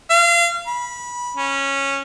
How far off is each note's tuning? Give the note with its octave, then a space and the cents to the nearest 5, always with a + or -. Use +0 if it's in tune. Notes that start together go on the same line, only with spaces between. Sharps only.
F5 -30
B5 -20
C#4 -10